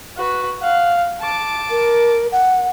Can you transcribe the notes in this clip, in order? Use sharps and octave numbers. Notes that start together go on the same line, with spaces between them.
F#4 B4
F5 F#5
A5 D6
A#4
F#5